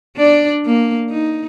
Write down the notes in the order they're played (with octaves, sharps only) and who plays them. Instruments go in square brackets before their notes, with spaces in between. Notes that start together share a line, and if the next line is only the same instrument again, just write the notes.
[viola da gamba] D4 D5
A#3
D#4